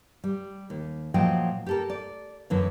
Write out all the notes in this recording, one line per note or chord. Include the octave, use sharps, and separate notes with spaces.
G3
D#2
A#2 F3 F#3 D#5 G5
G4 A4 A#4
D5
F#2 D3 E3